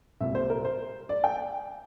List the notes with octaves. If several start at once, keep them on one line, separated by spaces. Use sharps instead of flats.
C2 A#2 G3 E5
C5
A#4
C5
D5
G5